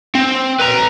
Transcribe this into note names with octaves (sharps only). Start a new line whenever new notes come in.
C4
B4 A#5